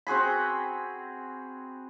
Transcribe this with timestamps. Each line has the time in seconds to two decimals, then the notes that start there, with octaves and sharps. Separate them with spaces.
0.07 C4 F#4 G#4 B5